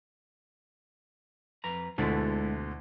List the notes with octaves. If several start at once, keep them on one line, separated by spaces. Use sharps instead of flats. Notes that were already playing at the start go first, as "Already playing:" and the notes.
F2 B4 A#5
D2 B2 D3 G#3 E4 F4